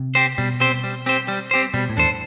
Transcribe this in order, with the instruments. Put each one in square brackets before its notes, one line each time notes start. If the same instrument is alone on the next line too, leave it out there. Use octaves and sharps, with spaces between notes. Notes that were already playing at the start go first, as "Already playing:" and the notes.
Already playing: [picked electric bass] C3
[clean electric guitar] C4 G4 C5
[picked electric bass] B2 [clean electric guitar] G3
[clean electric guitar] C4 G4 C5
G3
C4 G4 C5
G3
C4 G4 C5
[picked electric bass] B2 [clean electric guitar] G3
[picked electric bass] A2
[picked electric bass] E2 [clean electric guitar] D4 A4 C5